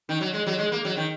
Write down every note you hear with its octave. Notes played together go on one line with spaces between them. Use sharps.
D#3
F#3
G#3
F#3
G#3
A#3
F#3
D#3